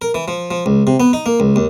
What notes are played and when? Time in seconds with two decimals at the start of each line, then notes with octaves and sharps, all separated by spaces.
0.02 A#4
0.14 E3
0.28 F3
0.51 F3
0.66 C#2
0.87 C3
1.00 B3
1.13 D#4
1.26 A#3
1.40 C#2
1.56 D#2